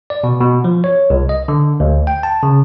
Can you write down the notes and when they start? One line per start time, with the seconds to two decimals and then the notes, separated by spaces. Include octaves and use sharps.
0.10 D5
0.24 B2
0.41 B2
0.64 F3
0.84 C#5
1.10 C2
1.29 D#5
1.48 D3
1.80 D2
2.07 G5
2.23 A5
2.43 C#3